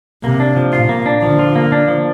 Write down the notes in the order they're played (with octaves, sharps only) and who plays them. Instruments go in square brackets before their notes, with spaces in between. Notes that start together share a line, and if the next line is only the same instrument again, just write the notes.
[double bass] C3 [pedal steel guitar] A#3
[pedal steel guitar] D4
F3
[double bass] A#2 [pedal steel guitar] F4
[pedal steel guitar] A#3
D4
[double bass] D3 [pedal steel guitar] F3
[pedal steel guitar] F4
A#3
D4
F3